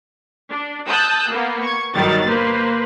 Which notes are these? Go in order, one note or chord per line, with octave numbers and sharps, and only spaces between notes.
D4
A5 D#6 E6 F#6 G6
A#3 B3
C#6 G#6
G1 D#3 F#3 G3 A6
A#3 B4 C5